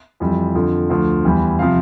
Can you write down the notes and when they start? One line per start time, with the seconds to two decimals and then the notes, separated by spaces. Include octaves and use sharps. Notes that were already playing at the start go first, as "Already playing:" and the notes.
0.20 F2 E3 G3
0.55 F2 D3 F3
0.89 D2 D3 F3
1.25 E2 E3 G3
1.59 C3 F3 F5